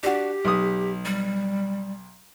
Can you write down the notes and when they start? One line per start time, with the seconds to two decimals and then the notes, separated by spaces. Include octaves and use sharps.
0.03 D4 F#4 G4
0.45 B1 D#6
1.05 G3